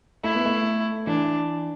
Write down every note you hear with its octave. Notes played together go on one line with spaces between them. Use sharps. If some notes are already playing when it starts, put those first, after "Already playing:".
A3 E4
B3
A3
E3 D4